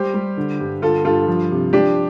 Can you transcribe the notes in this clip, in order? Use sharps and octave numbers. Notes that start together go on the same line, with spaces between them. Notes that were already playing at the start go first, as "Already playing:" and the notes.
Already playing: G3 G4 C5
G3
D3
G2
D3 F4 A4
G2 F4 A4
F3
C3
F3 D4 G4